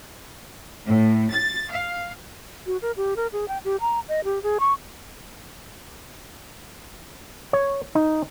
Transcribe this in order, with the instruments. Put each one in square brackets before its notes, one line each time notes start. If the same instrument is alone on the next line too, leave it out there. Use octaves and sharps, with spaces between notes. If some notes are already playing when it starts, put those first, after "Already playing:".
[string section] A2
A6
F5
[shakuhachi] F#4
A#4
G4
A#4
G#4
G5
G4
A#5
D#5
G4
G#4
C#6
[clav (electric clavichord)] C#5
D#4